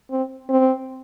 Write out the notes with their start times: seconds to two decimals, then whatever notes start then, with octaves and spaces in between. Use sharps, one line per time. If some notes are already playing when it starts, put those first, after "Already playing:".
0.11 C4
0.49 C4